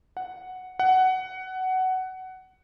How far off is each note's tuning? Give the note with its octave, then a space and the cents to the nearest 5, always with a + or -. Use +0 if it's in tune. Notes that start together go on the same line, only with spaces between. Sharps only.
F#5 +0
F#5 +15